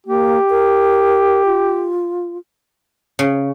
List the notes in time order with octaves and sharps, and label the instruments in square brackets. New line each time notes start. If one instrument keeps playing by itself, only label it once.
[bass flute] A#3 [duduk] G4
[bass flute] A#4
F4
[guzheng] C#3